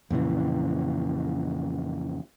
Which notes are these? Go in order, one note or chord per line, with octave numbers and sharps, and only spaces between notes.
F2 A#2 C#3 E3